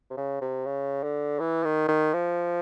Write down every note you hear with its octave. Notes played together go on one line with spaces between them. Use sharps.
C3
C#3
C3
C#3
D3
E3
D#3
D#3
F3